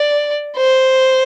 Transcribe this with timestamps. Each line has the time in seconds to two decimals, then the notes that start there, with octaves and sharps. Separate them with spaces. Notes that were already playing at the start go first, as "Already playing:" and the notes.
Already playing: D5
0.57 C5